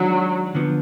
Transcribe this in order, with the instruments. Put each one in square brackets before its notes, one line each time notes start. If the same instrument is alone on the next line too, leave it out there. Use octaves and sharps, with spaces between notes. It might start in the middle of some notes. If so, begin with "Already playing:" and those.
Already playing: [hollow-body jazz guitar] D#3 G#3 D4 [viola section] F#3
[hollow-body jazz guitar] D3 F3 B3